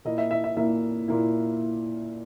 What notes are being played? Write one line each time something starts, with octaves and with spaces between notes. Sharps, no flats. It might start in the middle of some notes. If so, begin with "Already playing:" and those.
A#2 A#3 E4 D#5
E5
E5
E5
A#2 A#3 E4 E5
A#2 A#3 E4